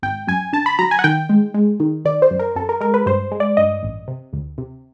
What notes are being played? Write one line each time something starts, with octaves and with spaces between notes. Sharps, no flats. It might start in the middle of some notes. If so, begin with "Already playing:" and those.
G#1 G5
F#2 G#5
D3 A5
B5
F#3 A#5
G#5
F#5
D#3 G5
G#3
G#3
D#3
D#3 D5
C5
F#2
A#4
F#2 A4
A#4
G#3 A#4
B4
G2 C5
G#3
D5
G2 D#5
A1
C3
D2
C3